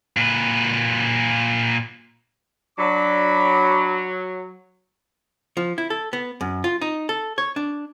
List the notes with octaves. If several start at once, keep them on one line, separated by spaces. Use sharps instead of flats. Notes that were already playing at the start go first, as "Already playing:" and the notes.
A#2 B4
F#3 D4 B5 D6
F3
E4
A4
B3
F#2
F4
D#4
A4
C#5
D4